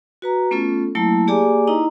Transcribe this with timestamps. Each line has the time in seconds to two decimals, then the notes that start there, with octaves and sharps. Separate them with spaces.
0.22 F#4 B4 A#5
0.51 A3 B3 C#4 F4 A4
0.95 F#3 A3 A#3 E4 A5
1.28 A#3 G4 G#4 D5 G#5 D6
1.67 D#4 E4 D#5 A#5